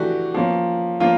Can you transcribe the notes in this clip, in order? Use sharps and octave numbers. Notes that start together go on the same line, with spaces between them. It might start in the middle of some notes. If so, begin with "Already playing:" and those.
Already playing: E3 A3 D4 F#4 G4
F3 A#3 C#4
F3 A#3 C#4 F4